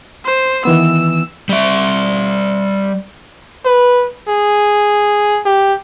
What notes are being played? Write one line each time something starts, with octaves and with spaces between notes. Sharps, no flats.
C5
D#3 E3 B3 E6
G3 E5
B4
G#4
G4